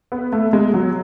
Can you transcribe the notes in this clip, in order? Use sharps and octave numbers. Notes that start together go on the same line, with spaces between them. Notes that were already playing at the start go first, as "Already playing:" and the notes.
B3
A3
G#3
F#3